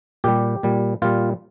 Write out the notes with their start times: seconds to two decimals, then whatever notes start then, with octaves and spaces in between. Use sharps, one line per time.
0.24 A#2 G3 G4
0.63 A#2 G3
1.02 A#2 G3 F4